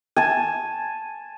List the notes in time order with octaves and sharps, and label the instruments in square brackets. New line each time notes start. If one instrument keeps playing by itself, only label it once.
[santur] G#5 A5